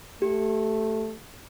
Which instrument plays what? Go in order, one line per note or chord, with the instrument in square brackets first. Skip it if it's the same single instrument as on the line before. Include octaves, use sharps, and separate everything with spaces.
[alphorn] A3 [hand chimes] G4